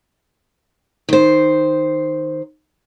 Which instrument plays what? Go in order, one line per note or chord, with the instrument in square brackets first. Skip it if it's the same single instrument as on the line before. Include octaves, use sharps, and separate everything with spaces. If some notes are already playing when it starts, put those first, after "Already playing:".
[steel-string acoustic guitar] D#3 C5